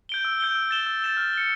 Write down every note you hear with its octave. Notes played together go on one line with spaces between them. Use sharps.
G6 D7 G7
E6
G6 D7 G7
E6
A6 E7 G7
E6
A6 E7 G7
F6
C#7 G7